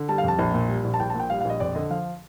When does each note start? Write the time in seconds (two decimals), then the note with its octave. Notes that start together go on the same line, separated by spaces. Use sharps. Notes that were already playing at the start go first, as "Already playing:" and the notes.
Already playing: D3
0.08 G3 A5
0.18 F5
0.23 F2 A5
0.39 A#1
0.54 A#2
0.69 G3
0.84 A#1
0.94 A5
1.00 A#1 G5
1.10 A5
1.15 A#2
1.20 G5
1.30 G3 F5
1.40 F5
1.45 A#1 D#5
1.60 F2 D5
1.75 D3 D#5
1.90 F3 F5